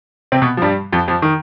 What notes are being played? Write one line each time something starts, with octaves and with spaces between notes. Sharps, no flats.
C3 C4
B2 B3
F3
G2 G3
F2 F3
F2 F3
D#3